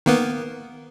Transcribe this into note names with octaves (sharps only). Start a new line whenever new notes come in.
D#3 A#3 B3